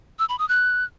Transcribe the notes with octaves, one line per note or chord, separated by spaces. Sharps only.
E6
B5
D#6
F#6